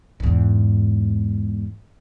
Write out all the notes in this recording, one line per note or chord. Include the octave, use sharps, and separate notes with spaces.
E2 G#2